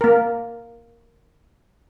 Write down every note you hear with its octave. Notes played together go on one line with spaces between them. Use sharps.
A#3 A#4